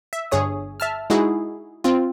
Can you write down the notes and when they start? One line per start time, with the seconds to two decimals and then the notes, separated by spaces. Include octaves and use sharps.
0.13 E5
0.31 G1 G2 G#4 C#5 D#6
0.80 E5 A5 F6
1.10 G#3 D#4 E4 F#4 G#4
1.84 C4 F4